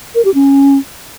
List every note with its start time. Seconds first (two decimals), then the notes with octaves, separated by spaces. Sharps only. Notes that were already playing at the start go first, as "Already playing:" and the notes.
0.15 A#4
0.25 G4
0.34 C#4